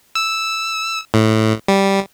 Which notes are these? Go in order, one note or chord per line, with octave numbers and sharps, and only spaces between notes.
E6
A2
G3